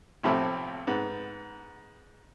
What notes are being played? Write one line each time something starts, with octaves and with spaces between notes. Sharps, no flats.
B1 A2 C3 F3 A3 C4
G#2 B3